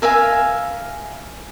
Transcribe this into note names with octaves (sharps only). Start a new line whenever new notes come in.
A#4 E5 F5 G#5